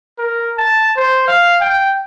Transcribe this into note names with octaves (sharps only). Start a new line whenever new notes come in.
A#4
A5
C5
F5
G5